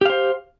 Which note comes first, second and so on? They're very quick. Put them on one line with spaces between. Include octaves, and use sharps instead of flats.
G4 F5 C5